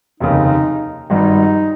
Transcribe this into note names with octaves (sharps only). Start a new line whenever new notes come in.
F1 D#2 C#3 D#4
G#1 G2 G3 D#4